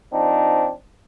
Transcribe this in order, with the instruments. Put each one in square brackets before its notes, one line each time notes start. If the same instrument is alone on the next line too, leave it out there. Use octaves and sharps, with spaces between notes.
[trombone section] F3 C4 D4 D#4